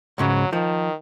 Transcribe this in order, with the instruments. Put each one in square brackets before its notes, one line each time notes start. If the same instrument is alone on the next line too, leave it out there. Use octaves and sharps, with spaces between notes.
[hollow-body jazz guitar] C#2 G#2 C#3 [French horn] F#3
[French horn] D#3 [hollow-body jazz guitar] F3